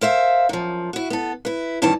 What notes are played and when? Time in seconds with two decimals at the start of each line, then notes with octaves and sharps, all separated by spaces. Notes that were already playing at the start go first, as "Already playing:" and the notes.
0.01 A#4 C5 E5 F5
0.49 F#2 F3
0.93 E4 F#4
1.10 B3 A4
1.45 E4 B4
1.82 G2 D#3 E3 C#4 A5